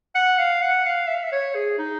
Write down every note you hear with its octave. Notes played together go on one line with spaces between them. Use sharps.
F#5
F5
F#5
F5
E5
F5
E5
C#5
G#4
D#4